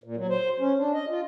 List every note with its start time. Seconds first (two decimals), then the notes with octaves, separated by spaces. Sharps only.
0.04 A#2
0.17 F#3
0.30 C5
0.60 C#4
0.78 D4
0.93 D#5
1.10 F4